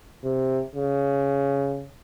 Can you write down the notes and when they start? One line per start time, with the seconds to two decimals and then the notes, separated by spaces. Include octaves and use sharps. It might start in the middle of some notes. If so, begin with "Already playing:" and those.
0.24 C3
0.76 C#3